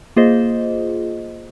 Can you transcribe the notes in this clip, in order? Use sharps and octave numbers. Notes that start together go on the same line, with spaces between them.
A#3 F4 G#4 C5 D#5